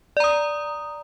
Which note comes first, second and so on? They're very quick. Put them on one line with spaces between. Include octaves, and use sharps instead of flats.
D5 A#5 D#6